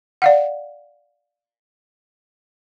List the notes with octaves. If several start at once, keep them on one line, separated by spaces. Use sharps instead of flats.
D5 F5 F#5